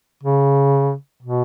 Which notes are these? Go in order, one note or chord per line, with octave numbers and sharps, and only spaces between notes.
C#3
B2